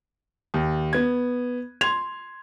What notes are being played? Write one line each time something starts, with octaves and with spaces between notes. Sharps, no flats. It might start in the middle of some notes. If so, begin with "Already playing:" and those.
D#2
B3 G#6
C6 G#6 F7